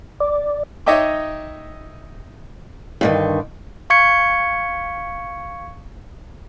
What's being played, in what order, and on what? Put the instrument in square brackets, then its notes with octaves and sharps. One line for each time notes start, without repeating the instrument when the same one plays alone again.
[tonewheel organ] D5
[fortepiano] D#4 C#5 D#5 E5 G5 D6
[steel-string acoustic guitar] G2 D3 D#3
[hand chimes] F5 C#6 G#6 C#7